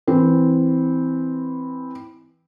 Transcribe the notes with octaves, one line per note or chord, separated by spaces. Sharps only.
E3 C4